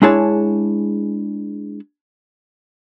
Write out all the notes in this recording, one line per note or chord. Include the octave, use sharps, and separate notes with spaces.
G#3 D4 E4 G#4 C#5 A5